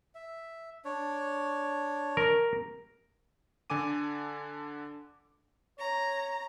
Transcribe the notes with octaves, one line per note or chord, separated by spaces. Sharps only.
E5
D4 C#5
A#4
D3 A4 G#5 D6 D#7
C#5 A#5